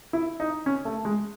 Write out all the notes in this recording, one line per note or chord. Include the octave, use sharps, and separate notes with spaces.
E4
D#4
C#4
A3
G#3